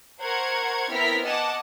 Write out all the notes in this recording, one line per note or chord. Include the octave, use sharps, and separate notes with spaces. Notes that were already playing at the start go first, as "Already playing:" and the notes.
A#4 C5 F#5 C#6 G#6
B3 C4 E4 A#4 F6 B6
D#5 F#5 G#5 A5 D6